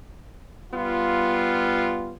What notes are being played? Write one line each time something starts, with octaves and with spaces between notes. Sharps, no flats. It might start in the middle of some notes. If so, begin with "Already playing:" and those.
G3 B3 F4